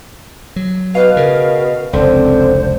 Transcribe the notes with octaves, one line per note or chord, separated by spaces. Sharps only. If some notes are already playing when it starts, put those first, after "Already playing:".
F#3
B2 B4 F5
C#3 A#4
F1 C#2 D3 C4 C5